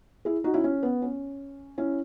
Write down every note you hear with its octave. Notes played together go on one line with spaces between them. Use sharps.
E4 G#4
D#4 F#4
C#4 E4
C#4
B3
C#4
C#4 E4